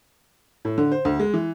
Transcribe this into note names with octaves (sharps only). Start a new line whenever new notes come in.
A2
D3
C5
D2
G#3
E3